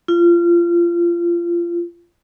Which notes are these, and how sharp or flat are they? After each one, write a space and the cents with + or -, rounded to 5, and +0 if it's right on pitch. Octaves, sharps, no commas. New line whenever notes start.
F4 -25